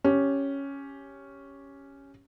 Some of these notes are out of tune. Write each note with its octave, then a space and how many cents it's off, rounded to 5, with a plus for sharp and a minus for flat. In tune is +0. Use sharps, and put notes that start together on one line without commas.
C#4 +0 G4 +0